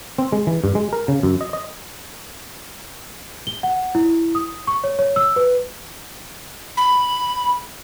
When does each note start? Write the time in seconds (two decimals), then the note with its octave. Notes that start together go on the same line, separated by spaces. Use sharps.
0.18 C4
0.32 G#3
0.47 E3
0.64 G2
0.75 G#3
0.93 A#4
1.08 C#3
1.23 F#2
1.41 D#5
1.53 D#5
3.47 G7
3.63 F#5
3.95 E4
4.35 D#6
4.67 C#6
4.84 C#5
4.99 C#5
5.16 E6
5.36 B4
6.77 B5